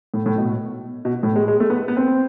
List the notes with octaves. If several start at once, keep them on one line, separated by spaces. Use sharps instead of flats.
A2
A2
B2
B2
A2
G#3
G#3
A3
B3
B3
C4